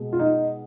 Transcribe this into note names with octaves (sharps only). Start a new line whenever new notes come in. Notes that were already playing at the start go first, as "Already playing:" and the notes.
Already playing: B2 G#3
F4
D#4